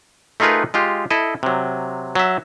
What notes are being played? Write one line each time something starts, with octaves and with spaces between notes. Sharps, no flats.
A3 D#4 F4 G#4 A#4 B4
G#3 F4 G4
E4 A4 D#5
C3 F#3
F#3 E5